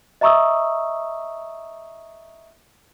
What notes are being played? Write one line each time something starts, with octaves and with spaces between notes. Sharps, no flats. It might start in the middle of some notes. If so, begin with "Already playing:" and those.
D#5 E5 A#5 C#6 D#6 E6